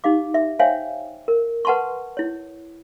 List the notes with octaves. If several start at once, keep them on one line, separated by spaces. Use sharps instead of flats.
D#4 G4 F5 D6
E5
C5 C#5 E5 F5 G5 G#5
A#4
B4 F#5 A5 C6 C#6
E4 C#5